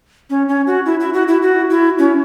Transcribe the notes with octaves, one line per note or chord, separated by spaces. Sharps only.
C#4
C#4
F#4
E4
E4
F#4
E4
F#4
E4
C#4